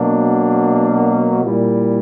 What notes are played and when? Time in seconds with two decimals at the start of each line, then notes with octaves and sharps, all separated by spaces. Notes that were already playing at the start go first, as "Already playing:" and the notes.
Already playing: B2 F#3 A#3 D4
1.42 A#2 G3 A#3 E4